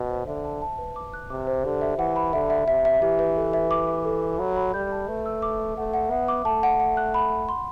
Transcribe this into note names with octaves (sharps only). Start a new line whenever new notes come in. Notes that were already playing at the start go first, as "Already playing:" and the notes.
Already playing: B2
C5
D3 E5
A5
A5
B4
D6
F#6
C3 D6
C5
D3 G4
E5
E3 F#5
B5
D3 E5
E5
C3 E5
E5
E3 G4
B4
A4
E5
D6
E5
A4
E5
F#3 B5
B5
G3 G6
A5
A3 B4
E6
D6
E5
A3 F#5
F#5
B3 E5
D6
A3 A5
F#5
F#5
F#6
B5
F#5
C6